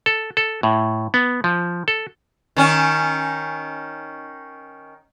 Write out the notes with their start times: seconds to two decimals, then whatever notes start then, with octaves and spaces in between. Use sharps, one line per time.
0.06 A4
0.37 A4
0.63 A2
1.14 B3
1.44 F3
1.88 A4
2.57 D#3 C#4